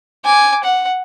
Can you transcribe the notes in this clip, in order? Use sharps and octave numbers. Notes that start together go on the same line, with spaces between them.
G#5 D6
F#5